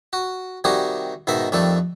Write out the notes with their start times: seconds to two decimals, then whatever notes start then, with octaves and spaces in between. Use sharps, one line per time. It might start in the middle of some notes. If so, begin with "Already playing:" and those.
0.13 F#4
0.64 C3 D#3 G3 D#4 F#4 G#4
1.27 G#2 B2 D#3 D#4 E5
1.52 F2 D#3 G3 A3 A4 D5